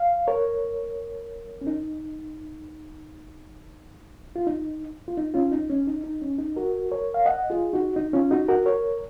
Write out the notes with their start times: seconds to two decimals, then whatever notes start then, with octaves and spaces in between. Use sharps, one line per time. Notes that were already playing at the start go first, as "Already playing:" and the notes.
Already playing: F5
0.27 A#4 C#5
1.61 C#4
1.67 D#4
4.36 F4
4.47 D#4
5.08 F4
5.17 D#4
5.34 C#4 F4
5.52 D#4
5.70 C#4
5.87 D#4
6.04 D#4
6.22 C#4
6.38 D#4
6.56 F#4 A#4
6.92 A#4 C#5
7.14 F5
7.26 D#5 F#5
7.50 F4 G#4
7.73 D#4 F#4
7.96 D#4
8.13 C#4 F4
8.31 D#4 F#4
8.49 F#4 A#4
8.66 A#4 C#5